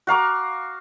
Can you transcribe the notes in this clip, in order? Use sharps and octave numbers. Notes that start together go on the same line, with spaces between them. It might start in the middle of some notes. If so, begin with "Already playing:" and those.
F#4 F5 A#5 D6